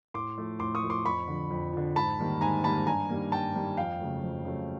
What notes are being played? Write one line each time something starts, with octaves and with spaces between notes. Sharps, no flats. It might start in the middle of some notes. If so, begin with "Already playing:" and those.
A2 C6 D6
F3 A3
A2 C6 D6
C#6 D#6
F3 A3
C6 D6
F2 B5 C#6
D3 F3
F2
D3 F3
G#2 A5 B5
D#3 G3 A#3
G#2 G#5 A#5
D#3 G3 A#3 A5 B5
G2 G#5 A#5
D#3 G3 A#3
G2 G5 A5
D#3 G3 A#3
F2 F5 G5
C#3 F#3 A3
F2
C#3 F#3 A3